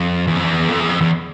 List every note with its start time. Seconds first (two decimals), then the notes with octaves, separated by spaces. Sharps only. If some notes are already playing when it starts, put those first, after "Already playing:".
Already playing: F2
0.27 E2
0.36 F2
0.44 E2
0.68 F2
0.79 E2
0.89 F2
1.01 E2